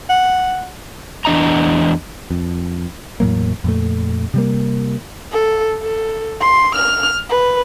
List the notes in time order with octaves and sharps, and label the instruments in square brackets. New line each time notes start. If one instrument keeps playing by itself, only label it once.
[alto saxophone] F#5
[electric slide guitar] E2 D4 D#5 A#5
[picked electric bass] F2
E2 A2 F#3 A#3
F2 A#2 A3
C3 G3 A#3
[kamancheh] A4
A4
C6
F6
B4